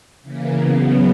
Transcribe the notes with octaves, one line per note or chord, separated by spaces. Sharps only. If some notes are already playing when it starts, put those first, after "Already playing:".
C#3 E3 A#3
C#3 F#3 B3